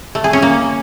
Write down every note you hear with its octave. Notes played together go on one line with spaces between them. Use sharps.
A3
G#4
C#4
A#3